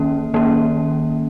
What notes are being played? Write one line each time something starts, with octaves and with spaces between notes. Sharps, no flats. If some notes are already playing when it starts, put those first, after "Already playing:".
Already playing: D#3 A#3 C#4
D#3 A#3 C#4